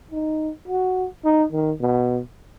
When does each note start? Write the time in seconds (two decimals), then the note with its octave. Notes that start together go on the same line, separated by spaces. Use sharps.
0.11 D#4
0.68 F#4
1.24 D#4
1.52 D#3
1.81 B2